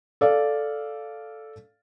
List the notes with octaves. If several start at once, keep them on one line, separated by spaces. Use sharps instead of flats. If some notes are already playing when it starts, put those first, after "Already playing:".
A4 D5 F5